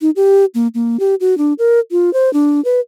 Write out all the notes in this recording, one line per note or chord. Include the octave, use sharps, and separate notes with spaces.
D#4
G4
A#3
A#3
G4
F#4
D4
A#4
F4
C5
D4
B4